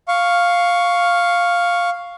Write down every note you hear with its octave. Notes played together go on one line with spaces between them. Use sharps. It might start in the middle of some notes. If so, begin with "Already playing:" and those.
F5 C#6